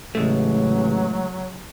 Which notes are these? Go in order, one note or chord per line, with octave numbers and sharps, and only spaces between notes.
A1 C#3 F#3 G#3 A3